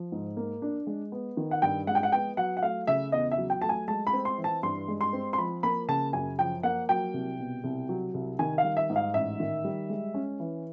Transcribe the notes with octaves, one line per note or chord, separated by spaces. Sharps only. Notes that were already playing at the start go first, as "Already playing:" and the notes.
Already playing: F3
G#2
A#3
D4
G#3
B3
D#3
F#5
G2 G5
G#3 F#5
G5
F#5
B3 G5
F#3 F#5
F#5
A3 F5
C#3 E5
E2 D#5
E5
F#3
G5
A3 A5
G#5
G#3 A5
B5
C4
C6
E3
A5
G2 C6
G#3
C6
C4
C6
F3 B5
A#3 B5
C#3 A5
F#2 G#5
F3 G5
A#3 F#5
F#3 G5
C2
B2
C2
F#3
C2
D#3 G#5
F5
G3
E5
G#2
F5
A1 E5
D#3
G3
G#3
C#4
E3